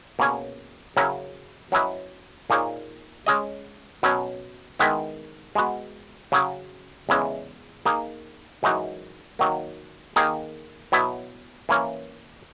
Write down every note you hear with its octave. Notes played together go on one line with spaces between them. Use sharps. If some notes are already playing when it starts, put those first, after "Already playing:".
B2 A#3 C#4 G#4 C#5
C#3 F#3 C#4 E4 A#4
F#3 C#4 E4 B4 D#5
A#2 A#3 D#4 G#4 C#5
G#3 C#4 G#4 D#5
B2 F#3 C#4
D#3 G#3 B3 E4
G#3 B3 F#4
C#3 F#3 C#4 G#4
E2 C#3 E3 G#3 C#4
A#3 D#4 G#4
F#2 E3 G#3 D#4 F#4
D#3 F#3 A#3
D#3 A#3 D#4 G#4 D#5
B2 F#3 B3 E4
E3 A#3 C#4